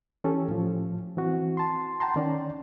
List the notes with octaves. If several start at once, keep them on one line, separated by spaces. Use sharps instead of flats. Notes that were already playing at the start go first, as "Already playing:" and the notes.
E3 C#4 G4 A4
A2 F3
E3 C4 F#4
A5 C6
F#5 G5 A5 A#5 C6
D#3 C#4 D5